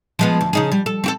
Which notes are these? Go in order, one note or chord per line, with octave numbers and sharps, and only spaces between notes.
F3 G#3 B3
D2
C#3 D#4 G#4
G3
A4
C4 F#4 A4